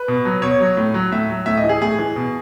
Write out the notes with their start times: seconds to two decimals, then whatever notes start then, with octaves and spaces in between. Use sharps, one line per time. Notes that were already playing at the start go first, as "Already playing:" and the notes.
Already playing: B4
0.08 B2
0.25 F#3
0.42 B2 C#5
0.60 F#3
0.77 A2
0.94 F#3
1.11 A2 E5
1.30 F#3
1.46 A2 E5
1.57 D#5
1.64 E3
1.69 G#4
1.81 A2 G#4
1.99 E3
2.16 B2